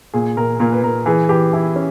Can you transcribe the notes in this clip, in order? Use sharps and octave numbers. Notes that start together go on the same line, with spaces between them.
A#2 G#4
A#2 A#4
A#2 A#4
B4
A#2 A#4
E3 G#4
E3 G4
E3 E4
C#4